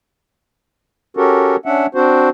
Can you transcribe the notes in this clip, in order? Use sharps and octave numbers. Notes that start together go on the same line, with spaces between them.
C#4 F#4 G4 A4 A#4
C#4 D4 E5 F#5
C4 D4 F#4 C5